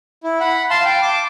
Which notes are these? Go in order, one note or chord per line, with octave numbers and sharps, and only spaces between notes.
E4
F#5 B5
F5 A5 C6
F5 G5
A5 D6